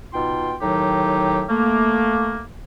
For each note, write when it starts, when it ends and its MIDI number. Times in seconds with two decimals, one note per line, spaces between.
0.13 0.54 47
0.13 0.54 63
0.13 0.54 65
0.13 0.54 79
0.13 0.54 84
0.61 1.43 45
0.61 1.43 51
0.61 1.43 54
0.61 1.43 63
0.61 1.43 67
1.50 2.40 57
1.50 2.40 58